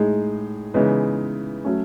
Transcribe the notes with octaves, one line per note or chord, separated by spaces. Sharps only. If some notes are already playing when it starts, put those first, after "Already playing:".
Already playing: A2 G#3 D#4 G#4
C#3 E3 G#3 B3 D#4
F#3 A3 C#4